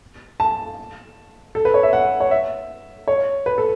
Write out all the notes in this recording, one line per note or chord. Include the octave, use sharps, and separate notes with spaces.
A5
A4
B4
C#5
E5
F#5
C#5
E5
C#5
B4
A4